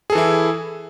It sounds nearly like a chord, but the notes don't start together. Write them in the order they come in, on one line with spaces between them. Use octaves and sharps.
G#4 A4 E3 E4